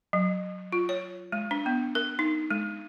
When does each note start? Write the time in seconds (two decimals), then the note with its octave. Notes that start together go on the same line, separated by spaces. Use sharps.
0.13 F#3
0.72 F4
0.89 C#5
1.32 G#3
1.51 D4
1.66 B3
1.95 A#4
2.19 D#4
2.51 G#3